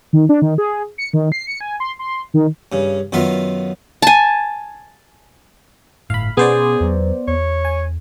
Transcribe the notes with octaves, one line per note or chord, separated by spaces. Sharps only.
D#3
D4
D#3
G#4
C#7
D#3
C7
C#7
G#5
C6
C6
D#3
G2 C#3
F#2 D#3 B3 F4 E5 F5
G#5 A5
G1 A2 F5 B5
B2 B3 C#4 G#4 C5 D5
E2 F#3
E2 C#5
G#5